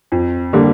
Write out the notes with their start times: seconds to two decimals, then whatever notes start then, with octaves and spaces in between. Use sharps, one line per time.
0.12 F2
0.53 D3 G3 A#3